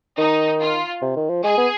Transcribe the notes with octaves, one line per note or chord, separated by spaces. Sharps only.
D#3 D#4
F4
C3
D#3
F3
G#3 G#4
B3